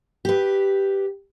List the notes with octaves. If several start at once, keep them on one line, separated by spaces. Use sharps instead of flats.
G4 B4